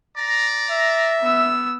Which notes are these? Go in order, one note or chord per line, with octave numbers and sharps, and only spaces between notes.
D5 A#5
E5
B3 E6